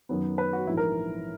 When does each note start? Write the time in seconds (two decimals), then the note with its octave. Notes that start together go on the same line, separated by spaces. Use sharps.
0.09 F#2 D#3 F#3 B3
0.38 B4
0.53 F#4
0.67 A#1 G#2 E3 E4
0.77 A#4